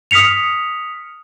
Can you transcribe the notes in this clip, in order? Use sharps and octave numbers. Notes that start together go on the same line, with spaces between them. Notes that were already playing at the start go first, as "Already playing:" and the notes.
D#6 F6 B6 C#7 F7